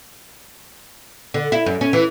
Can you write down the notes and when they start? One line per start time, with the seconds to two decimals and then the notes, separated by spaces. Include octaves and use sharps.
1.34 D3
1.52 E4
1.66 F#2
1.81 C#4
1.93 E3